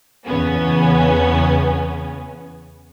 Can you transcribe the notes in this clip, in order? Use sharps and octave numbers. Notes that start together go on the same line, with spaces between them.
E2 C#3 B3 C#4